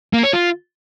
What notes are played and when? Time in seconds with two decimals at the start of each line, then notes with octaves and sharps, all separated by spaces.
0.13 A#3
0.23 C#5
0.33 F4